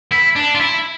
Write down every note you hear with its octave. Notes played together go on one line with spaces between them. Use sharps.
E4
D4
F4
E4